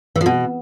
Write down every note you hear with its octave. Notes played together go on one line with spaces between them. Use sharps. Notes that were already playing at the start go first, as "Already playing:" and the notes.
E3
F3
B2